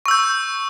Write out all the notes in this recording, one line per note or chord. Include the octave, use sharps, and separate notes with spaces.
C#6 E6 G6